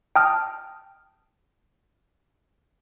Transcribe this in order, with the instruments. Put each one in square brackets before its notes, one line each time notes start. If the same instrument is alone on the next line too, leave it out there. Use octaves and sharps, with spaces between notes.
[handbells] G5 A5 D#6 F6